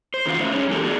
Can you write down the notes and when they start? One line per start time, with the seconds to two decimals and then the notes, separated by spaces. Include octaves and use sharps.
0.14 C5
0.26 E2 C#3 F3 F#4 F5
0.38 A3 C#4 D#4 C5 E5
0.53 G3 C#4 G#4 C#5
0.70 E3 G#3 A#3 D#4 G4 A4
0.82 A3 B3 D4 E4 F#4 G#4